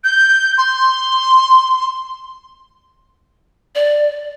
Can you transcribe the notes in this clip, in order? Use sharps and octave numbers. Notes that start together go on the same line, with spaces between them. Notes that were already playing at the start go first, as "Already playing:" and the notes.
G6
C6
D5